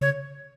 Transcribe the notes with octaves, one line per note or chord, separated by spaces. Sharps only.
C#3 C#5